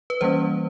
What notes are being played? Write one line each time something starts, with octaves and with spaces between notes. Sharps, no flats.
B4
E3 G3 A#3 C#4 C5